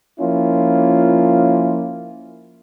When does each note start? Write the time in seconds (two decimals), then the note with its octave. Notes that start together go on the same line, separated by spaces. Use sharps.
0.19 F3 A#3 C#4 E4 F4